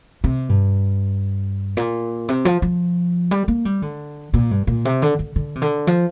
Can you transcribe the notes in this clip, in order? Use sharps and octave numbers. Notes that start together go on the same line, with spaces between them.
C3
G2
A#2
C3
F3
F3
G3
A#3
G3
D3
A#2
G2
A#2
C3
D3
D3
D3
C3
D3
F3